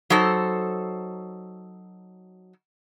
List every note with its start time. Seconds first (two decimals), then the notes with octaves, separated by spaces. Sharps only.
0.10 F#3 D#4 A4 C5